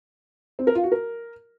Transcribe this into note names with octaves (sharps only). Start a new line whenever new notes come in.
C4
A#4
F4
F#4
A#4